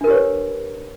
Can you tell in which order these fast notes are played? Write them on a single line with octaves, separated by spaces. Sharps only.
D4 A#4 G4 C#5 B4